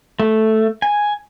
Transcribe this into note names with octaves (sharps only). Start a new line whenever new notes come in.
A3
G#5